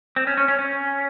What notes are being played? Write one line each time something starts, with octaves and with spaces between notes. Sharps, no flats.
C4
C#4
C#4
C#4
C#4